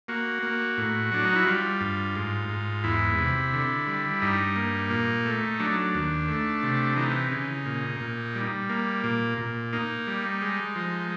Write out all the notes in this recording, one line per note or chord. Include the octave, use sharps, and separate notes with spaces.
A#3 F#4
A#3
A2
F#3 D4
D#4
E4
G3 F4
G2
G#2
G#2
E2 E4
C3
D3
G3
G2 D#4
A#3
A#2
A3
F#3 D4
D#2
A3
C3
E3 D#4
C#3
A#2
A#2
G3
A#3
A#2
A#2
A#3 D#4
G3
G#3
F3